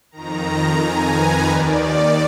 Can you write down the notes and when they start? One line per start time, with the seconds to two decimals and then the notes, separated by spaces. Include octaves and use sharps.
0.11 F2 D#3 A#5
0.81 G#5
1.15 B4
1.49 D#2 D#3 D5